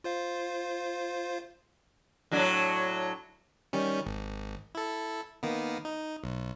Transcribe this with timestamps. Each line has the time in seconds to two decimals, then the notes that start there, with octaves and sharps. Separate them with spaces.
0.04 F4 C5 F5
2.31 A2 F#3 D4
3.73 D#3 G3 C#4
4.06 G#1
4.75 E4 A4
5.43 D#3 A#3 B3
5.85 D#4
6.24 B1